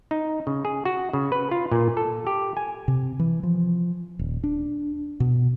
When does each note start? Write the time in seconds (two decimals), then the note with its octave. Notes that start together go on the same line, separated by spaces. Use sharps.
0.11 D#4
0.47 C#3
0.65 G#4
0.85 F#4
1.13 C#3
1.32 B4
1.51 F4
1.71 A#2
1.97 A4
2.27 G4
2.57 G#5
2.88 C3
3.20 E3
3.43 F3
4.19 D#1
4.44 D4
5.20 B2